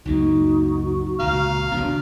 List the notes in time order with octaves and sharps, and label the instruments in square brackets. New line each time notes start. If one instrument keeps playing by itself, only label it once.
[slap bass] C#2 F#2 A#3 [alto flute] D#4 [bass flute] F#4
[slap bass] C#2 A#2 [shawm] F5 [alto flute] A#5
[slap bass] C3 D#3 B3 [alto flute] D4